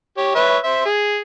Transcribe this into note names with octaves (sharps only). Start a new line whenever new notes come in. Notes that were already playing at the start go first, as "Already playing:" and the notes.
G4 C#5
B4 C#5 E5
C5 E5
G#4